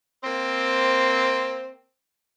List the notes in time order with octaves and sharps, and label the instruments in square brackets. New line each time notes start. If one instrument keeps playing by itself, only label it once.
[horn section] A#3 C4